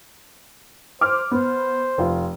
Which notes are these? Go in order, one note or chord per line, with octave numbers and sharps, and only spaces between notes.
C5 D6 F6
B3 C5
F1 F4